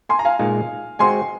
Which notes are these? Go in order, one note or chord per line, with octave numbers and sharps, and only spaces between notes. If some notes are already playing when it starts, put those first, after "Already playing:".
G#5 C6
A#5
F5 G#5
A#2 G#3 D#4
G#3 C4 F#4 G#5 C6